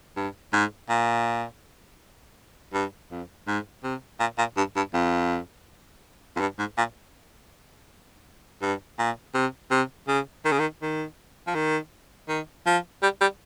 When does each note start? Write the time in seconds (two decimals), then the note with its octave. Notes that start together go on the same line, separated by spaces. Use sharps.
0.16 G2
0.53 G#2
0.89 A#2
2.73 G2
3.11 F2
3.47 G#2
3.83 C3
4.20 A#2
4.38 A#2
4.57 G2
4.76 G2
4.94 F2
6.36 F2
6.40 G2
6.59 G#2
6.77 A#2
8.62 G2
8.99 A#2
9.34 C3
9.71 C3
10.08 C#3
10.45 D#3
10.52 C#3
10.59 D#3
10.82 D#3
11.47 F3
11.55 D#3
12.29 D#3
12.66 F3
13.03 G3
13.21 G3